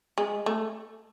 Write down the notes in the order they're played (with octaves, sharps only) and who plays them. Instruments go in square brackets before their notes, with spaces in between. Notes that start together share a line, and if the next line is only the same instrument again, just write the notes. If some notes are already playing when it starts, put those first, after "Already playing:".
[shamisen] G#3
A3